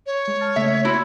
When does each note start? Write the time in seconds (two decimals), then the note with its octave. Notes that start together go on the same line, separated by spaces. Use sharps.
0.06 C#5
0.28 G#3
0.40 A5 F6 A6
0.56 C#3 A3 A#3 E5
0.85 A#3 E4 F#4 C6